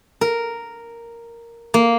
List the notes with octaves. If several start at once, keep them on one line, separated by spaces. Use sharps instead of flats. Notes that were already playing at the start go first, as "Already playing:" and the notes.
A#4
A#3